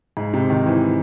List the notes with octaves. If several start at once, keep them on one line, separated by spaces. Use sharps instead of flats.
G#2
C3
D#3
E3
E3